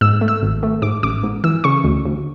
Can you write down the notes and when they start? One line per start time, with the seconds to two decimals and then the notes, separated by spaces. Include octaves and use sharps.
0.01 G#2 E6
0.21 A3
0.28 E6
0.42 G#1
0.63 A3
0.82 G#2 D6
1.03 A1 D6
1.24 G#2
1.44 E3 E6
1.64 C#3 C#6
1.84 D2
2.06 D2